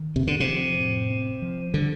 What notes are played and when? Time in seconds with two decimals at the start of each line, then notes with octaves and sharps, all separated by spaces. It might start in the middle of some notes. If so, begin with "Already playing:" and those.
Already playing: D#3
0.16 F2 C3
0.27 D3
0.40 C3
0.47 F3
0.79 A2
1.10 C4
1.42 F3
1.74 D3 G3